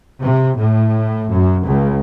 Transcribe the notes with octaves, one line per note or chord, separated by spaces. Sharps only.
C3
A2
F#2
C#2